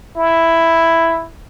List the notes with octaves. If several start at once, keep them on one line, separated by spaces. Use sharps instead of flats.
E4